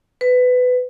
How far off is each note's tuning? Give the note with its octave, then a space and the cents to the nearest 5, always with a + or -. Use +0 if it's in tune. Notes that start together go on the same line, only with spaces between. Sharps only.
B4 +20